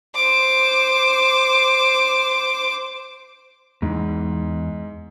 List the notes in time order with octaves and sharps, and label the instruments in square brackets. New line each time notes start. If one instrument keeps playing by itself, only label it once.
[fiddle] C5 D6
[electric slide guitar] E2 [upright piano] G#2